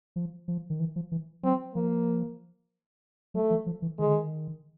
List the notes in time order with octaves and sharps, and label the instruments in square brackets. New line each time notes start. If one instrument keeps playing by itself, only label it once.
[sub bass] F3
F3
D#3
E3
F3
E3
[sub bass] F#3 [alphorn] C4
[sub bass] F3 [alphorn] A#3
[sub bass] F#3 [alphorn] A3
[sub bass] F3
F3
E3
[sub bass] D#3 [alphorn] G#3
[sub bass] D3
D#3